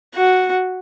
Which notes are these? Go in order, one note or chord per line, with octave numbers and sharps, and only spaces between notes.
F#4